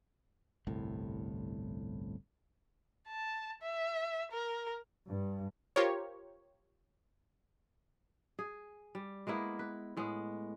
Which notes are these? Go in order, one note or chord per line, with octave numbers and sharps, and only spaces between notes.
G1 C2 A2
A5
E5
A#4
G2
F4 G4 A#4 C5 C#5
G#4
G3
G#3 A#3 B3 E4
B4
A2 G#3 B3